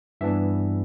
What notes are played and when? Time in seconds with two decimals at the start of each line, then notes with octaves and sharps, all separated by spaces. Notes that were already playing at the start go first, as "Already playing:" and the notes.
0.21 G2 E3 B3 D4 E5